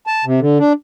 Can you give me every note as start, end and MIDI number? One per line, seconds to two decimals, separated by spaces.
0.07 0.25 81
0.25 0.40 48
0.40 0.58 50
0.59 0.73 62